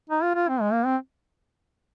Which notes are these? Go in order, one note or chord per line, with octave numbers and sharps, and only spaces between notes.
D#4
F4
F4
C4
G#3
A#3
C4